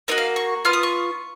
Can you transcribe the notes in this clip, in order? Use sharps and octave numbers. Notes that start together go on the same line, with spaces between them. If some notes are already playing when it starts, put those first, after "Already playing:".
A#3 D#4 F#4 D#5
F5
C#6
B3 F4 F6
D#6
C#6